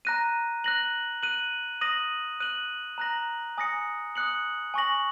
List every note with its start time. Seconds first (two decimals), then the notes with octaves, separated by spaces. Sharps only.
0.05 A#5 F#6 A#6 D#7
0.64 F#6 A#6 F#7
1.23 F#6 D#7 F#7
1.81 D#6 A#6 D#7 F#7
2.40 F#6 D#7 F#7
2.98 A#5 F#6 A#6 F#7
3.58 G#5 D#6 A#6 C#7
4.15 D#6 F#6 C#7 F#7
4.74 G#5 C#6 A#6 F#7